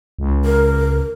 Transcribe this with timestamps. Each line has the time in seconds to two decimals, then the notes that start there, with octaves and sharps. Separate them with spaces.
0.19 C#2
0.45 A#4